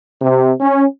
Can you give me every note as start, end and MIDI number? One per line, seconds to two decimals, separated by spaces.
0.22 0.52 48
0.60 0.84 61